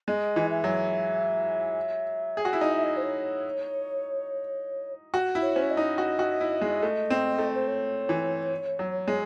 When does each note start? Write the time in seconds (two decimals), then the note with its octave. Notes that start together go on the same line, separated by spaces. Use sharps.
0.08 G#3 D#5
0.36 E3
0.50 E5
0.64 F#3
2.37 G#4
2.45 F#4
2.53 E4
2.60 D#4 D#5
2.71 E5
2.83 D#5
2.96 C5
3.02 C#5
5.14 F#4
5.35 E4
5.42 C#5
5.55 C#4 C5
5.62 C#5
5.70 D#5
5.77 D#4
5.98 F#4
6.19 F#4
6.41 E4
6.61 G#3
6.82 A3
7.10 C4
7.38 A3
7.54 C5
7.67 C#5
8.09 E3
8.79 F#3
9.08 G#3